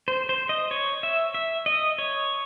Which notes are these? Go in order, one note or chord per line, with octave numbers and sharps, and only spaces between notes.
C5
C5
D#5
C#5
E5
E5
D#5
C#5